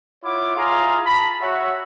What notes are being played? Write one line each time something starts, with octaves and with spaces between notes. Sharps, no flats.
E4 F4 C#5 E5 F#5 D6
E4 F4 G#4 F5 A#5 C6
A5 B5
F#4 C#5 E5